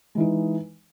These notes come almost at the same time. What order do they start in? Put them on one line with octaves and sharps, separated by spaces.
G#3 E3 D#4